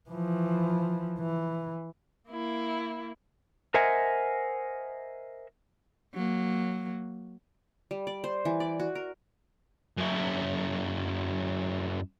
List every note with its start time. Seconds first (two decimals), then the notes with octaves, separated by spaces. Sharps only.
0.10 E3 F3
1.20 E3
2.29 A#3 E4
3.74 A#4 C5 D#5 E5 F#5 G#5
6.15 F#3 A#3
7.91 G3
8.07 D5
8.24 C5
8.45 E3
8.60 D5
8.80 F#4
8.95 A#4
9.97 F#2 E4